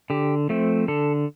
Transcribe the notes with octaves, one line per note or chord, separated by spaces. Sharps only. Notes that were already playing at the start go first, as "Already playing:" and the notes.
D3 G4
F3 A3 C4
D3 A4